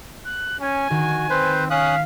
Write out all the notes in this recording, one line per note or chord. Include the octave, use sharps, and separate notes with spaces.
F#6
C#4 G#5
D#3 F#4
C4 B4 C5
C#4 F5 D#6 F#6 B6